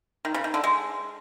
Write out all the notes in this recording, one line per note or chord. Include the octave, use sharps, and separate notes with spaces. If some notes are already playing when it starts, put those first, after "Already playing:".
D#3
C#3
D#3
D3
G#3